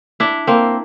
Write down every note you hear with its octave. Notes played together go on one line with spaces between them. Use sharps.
D4 E4
A#3 C4